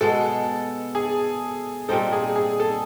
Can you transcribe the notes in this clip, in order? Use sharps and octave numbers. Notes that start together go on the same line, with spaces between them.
B2 G#3 B3 A4
G#4
A#2 G3 C4 D#4 A4
G#4
G#4
A4